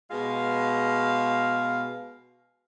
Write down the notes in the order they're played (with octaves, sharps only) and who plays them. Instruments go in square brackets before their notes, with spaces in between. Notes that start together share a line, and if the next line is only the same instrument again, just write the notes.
[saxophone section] B2 G#3 F5